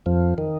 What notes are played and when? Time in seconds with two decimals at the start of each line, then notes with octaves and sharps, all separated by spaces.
0.06 F2 F3
0.38 D#3